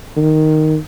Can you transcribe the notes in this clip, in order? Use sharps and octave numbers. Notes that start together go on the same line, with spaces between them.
D#3